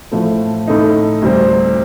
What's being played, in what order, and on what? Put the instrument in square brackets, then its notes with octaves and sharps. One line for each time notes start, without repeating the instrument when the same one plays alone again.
[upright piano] A2 F3 A3
A2 A3 D#4
D2 C3 G3 C4